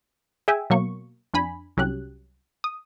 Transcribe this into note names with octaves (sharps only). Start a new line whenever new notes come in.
G#4 E5 G5 G#5
B2 F#3 A#3 C#6
F2 D4 G#5 B5
C2 F#3 C#4 G4 F#6
D#6